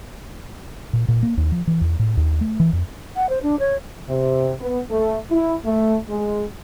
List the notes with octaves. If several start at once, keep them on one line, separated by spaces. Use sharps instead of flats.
A#2
A#2
A#3
D#2
F3
E3
E2
A2
D#2
A3
E3
F2
F#5
C5
D4
C#5
C3
B3
A3
E4
A3
G#3